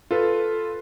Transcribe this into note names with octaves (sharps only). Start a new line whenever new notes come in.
F4 A4 B4